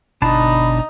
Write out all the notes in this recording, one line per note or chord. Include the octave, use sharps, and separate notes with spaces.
G1 B2 D4 D#4 A5 B5